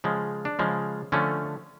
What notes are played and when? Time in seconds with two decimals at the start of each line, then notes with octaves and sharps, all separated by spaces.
0.04 C#3 F3 G#3
0.45 D4
0.59 C#3 F3 G#3
1.12 D3 F3 A3 C#4